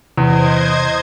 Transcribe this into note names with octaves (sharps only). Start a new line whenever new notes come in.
E2 C3 C5 D#5 G#6